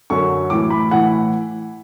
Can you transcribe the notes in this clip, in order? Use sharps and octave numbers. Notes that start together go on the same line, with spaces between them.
F#2 D3 F#3 C#6
A2 E3 D6
B5
A2 E3 F#5